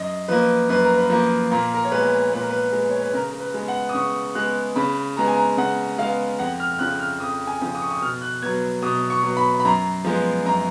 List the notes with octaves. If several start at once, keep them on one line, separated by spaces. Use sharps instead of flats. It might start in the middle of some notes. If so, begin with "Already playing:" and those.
Already playing: F#2 D#5
F3 A#3 B4
F#2 B4
A#4
B4
F3 A#3
A#2 A#4
A#4
C#5
G#3 B3 B4
A#2 B4
A#4
B4
G#3 B3
C#5
B4
C#3 A#4
A#4
B4
G#3 B3
F#5
D#6
C#3 C#6
G#3 B3 F#6
C#3 B5
G#3 B3 A#5
G#5
A#5
C#3 F#5
G#3 B3 F5
F2 F#5
F6
F6
C#3 F3 F#6
F6
F2 D#6
G#5
C#3 F3
D#6
C#6
D#6
B2 F6
F#6
F#3 B3 G#6
B2 D#6
C#6
F#3 B3
B5
B5
F#2 A#5
F3 G#3 B3
F#2 A#5